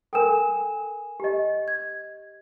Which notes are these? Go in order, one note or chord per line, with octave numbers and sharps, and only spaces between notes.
A4 A#4 G5 G#5 E7
G4 D#5
G#6